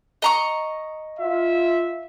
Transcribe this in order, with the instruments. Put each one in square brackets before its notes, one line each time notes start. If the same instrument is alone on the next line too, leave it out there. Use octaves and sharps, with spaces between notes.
[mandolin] D#5 A#5 C#6
[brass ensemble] F4 E5